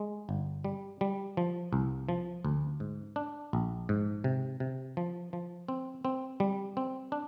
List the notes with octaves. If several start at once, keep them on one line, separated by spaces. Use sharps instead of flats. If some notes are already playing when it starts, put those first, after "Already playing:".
Already playing: G#3
G1
G3
G3
F3
C2
F3
D2
G#2
D4
A#1
G#2
C3
C3
F3
F3
C4
C4
G3
C4
D4